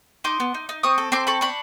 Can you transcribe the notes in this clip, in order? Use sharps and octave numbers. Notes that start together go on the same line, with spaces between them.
D#4 C6 D6
B3
D#4
D#4
C4 C#6 D#6
A4
C4 C6 D6
A4 B5 C#6
D4 B5 C#6